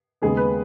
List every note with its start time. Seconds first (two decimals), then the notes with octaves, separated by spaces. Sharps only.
0.22 D#2 C#3 G#3 B3 G#4
0.37 B4